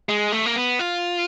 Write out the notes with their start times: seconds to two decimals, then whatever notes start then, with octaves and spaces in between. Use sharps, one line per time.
0.09 G#3
0.32 A3
0.46 A#3
0.56 B3
0.79 F4